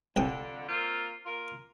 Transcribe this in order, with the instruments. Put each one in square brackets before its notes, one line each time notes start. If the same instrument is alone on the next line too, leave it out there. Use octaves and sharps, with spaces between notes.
[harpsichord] C2 G5 D#6 [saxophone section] F2 D3
[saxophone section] A#3 C4 F4
A#3 F4 A#4